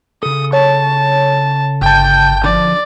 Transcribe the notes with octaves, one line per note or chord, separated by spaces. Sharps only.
C#3 A4 D#6
C#5 A5
G1 G5 A5 G6
D3 F3 D5